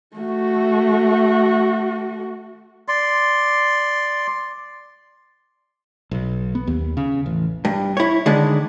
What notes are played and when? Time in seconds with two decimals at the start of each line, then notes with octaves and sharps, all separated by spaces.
0.17 A3 F#4
2.88 D5 C6
6.11 B1
6.55 B3
6.67 D#2
6.97 C#3
7.26 A1
7.65 G2
7.97 E4 C#5
8.26 D3 D#3 G#3 D4